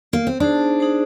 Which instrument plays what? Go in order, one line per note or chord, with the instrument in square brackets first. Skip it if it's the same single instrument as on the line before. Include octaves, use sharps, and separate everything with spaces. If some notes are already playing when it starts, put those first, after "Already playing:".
[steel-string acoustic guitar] A#3
C4
[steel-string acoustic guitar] D4 [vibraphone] D#4 G#4 C5
[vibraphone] D#4 G#4 C5